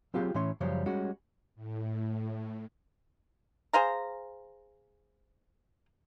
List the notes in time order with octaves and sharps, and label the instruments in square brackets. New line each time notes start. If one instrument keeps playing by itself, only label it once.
[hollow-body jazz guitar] F#3 C4 F4 G4 G#4 F5
A2 E3 A3 C#4 C#5 C6
F#2 C#3 F3 G3 C5 C#5
G3 G#3 C#4 F#4
[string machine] A2
[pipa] G#4 C5 F5 A#5